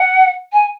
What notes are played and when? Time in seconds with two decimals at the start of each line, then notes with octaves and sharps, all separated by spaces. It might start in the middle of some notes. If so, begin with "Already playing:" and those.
Already playing: F#5
0.53 G#5